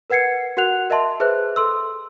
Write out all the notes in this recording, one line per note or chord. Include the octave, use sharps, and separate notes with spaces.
A#4 B4 F#5 G#6 C7 C#7
F#4 A#4 F#5 F#6 F7
A#4 D#5 E5 A5 C6
G#4 B4 C5 E5 F#6
A4 C6 E6